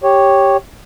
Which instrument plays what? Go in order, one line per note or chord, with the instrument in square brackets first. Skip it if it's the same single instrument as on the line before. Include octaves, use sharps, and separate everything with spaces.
[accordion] G4 C#5